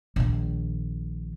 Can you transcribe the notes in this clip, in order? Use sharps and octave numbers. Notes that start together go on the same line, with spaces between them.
A#1 D#3